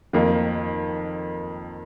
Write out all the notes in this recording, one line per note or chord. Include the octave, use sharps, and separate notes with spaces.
F2 D#3 A#3